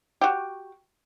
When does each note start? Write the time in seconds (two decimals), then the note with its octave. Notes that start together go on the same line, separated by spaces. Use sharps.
0.21 F#4 G4